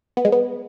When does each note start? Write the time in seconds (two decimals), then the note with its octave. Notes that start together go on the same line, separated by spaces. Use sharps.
0.17 B3
0.25 G#3
0.32 B3